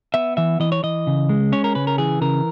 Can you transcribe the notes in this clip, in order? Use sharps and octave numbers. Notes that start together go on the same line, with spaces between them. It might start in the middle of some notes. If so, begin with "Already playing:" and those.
B3 E5
E3 E5
E3 D#5
C#5
E3 D#5
C#3
G#3
C#4 C#5
A#4
C#3 B4
A#4
E3 G#4
C#3 A#4